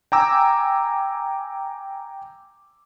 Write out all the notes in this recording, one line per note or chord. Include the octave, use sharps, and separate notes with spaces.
G5 G#5 A#5 D6 E6